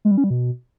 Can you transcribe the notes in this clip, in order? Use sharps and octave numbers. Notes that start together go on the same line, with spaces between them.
G#3
G3
C#4
G3
B2